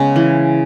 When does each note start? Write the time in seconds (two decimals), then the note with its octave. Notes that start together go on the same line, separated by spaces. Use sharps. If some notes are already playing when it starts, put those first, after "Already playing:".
Already playing: C#3 G#3 B3 C#4
0.16 E3